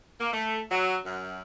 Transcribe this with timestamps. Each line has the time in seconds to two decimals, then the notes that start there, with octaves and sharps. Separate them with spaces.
0.20 A#3
0.32 A3
0.71 F#3
1.05 F#2